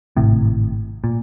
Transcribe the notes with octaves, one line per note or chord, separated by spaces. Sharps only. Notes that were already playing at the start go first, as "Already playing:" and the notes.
G#1 A2 C3
A#2